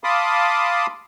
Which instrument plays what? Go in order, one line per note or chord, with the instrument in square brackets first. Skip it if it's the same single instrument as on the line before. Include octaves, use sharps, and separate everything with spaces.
[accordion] F5 A5 B5 C6 D6 D#6